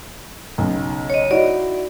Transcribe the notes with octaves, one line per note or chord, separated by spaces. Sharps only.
B1 C#3
C#5 D#5
D#4 E4 F#4 D5